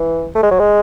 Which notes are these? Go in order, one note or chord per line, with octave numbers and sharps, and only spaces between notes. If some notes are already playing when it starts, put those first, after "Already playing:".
Already playing: E3
A3
G#3
F#3
G#3